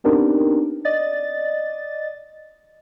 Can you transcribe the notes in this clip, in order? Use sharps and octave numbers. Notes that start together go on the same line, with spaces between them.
B3 C4 D4 D#4 G4 A#4
D5 D#5 A6